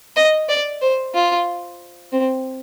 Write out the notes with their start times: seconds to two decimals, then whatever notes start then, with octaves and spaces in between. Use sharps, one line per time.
0.16 D#5
0.49 D5
0.82 C5
1.15 F4
2.12 C4